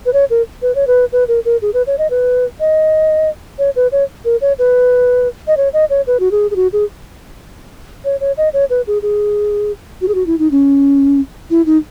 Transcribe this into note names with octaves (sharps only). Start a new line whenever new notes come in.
B4
C#5
A#4
B4
C#5
B4
B4
A#4
A#4
G#4
B4
C#5
D#5
B4
D#5
C#5
B4
C#5
A#4
C#5
B4
D#5
C#5
D#5
C#5
B4
F#4
G#4
G#4
F#4
G#4
C#5
C#5
D#5
C#5
B4
G#4
G#4
F#4
G#4
F#4
E4
D#4
C#4
E4
D#4